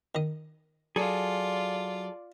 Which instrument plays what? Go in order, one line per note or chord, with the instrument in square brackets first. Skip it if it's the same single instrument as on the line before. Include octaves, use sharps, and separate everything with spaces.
[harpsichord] D#3 D#5
[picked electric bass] F#3 [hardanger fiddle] F4 D5 [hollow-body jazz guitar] G#4 A4